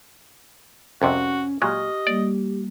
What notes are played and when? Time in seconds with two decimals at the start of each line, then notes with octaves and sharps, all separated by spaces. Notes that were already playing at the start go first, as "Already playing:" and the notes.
1.02 C2 F2 C3 C#4 F#4
1.62 A#2 F#3 G#3 G4 D#5 C#6 F6
2.07 G3 A#3 D5